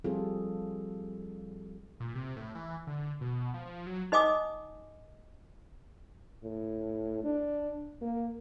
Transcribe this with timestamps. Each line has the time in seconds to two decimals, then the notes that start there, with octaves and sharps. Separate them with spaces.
0.04 F3 G3 C4 F4 G#4 A4
2.00 A#2
2.15 C3
2.36 A2
2.55 E3
2.87 D3
3.21 B2
3.54 F3
3.66 F3
3.87 F#3
4.12 D#4 D#5 G#5 D6 D#6
6.44 A2
7.24 D4
8.01 A#3